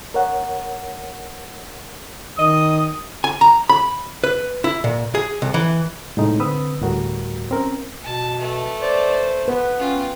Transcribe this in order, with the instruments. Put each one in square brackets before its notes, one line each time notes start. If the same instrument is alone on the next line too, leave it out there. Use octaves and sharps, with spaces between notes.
[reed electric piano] A#4 C#5 F#5
[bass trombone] D#3 [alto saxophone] D#5 [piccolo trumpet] D#6
[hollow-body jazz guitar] G#5
A#5
B5
B4
E4
A#2
G#4
C2
E3
[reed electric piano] A2 C3 G#3 D#4
D3 C4 B4 B5 D#6 E6
D2 A2 G3 F#4 A#4
C4 C#4 A#4
[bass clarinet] B2 [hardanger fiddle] A5
[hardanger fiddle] A3 B4
[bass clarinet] C5 [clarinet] D5
[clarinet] B3 [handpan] B4
[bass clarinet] C#4 [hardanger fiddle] F4 G5